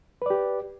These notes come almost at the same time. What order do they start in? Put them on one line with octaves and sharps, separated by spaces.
B4 D5 G4